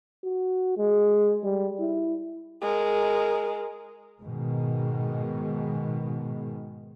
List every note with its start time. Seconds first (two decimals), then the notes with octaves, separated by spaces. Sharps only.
0.24 F#4
0.77 G#3
1.43 G3
1.80 E4
2.62 G#3 A#4
4.22 G#2 B2 D#3 G#3